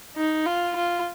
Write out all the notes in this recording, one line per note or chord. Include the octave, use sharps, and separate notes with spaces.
D#4
F4
F4